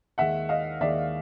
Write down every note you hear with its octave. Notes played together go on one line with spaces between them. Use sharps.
D#2 D#3 G#3 E5 F#5
D#5 F5
D#2 D#3 G#3 D5 E5